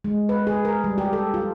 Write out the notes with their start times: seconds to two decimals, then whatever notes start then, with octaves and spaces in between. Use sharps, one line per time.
0.04 G#3
0.29 B4
0.47 G#4
0.65 A#4
0.84 G3
0.98 G4
1.13 A4
1.34 F4